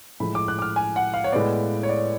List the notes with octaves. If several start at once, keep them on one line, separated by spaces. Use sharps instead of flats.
A2 F3 G#3 B5
D6
F#6
D6
F6
G#5
F#5
F5
C#5
A2 G#3 B3 D5
C#5
D5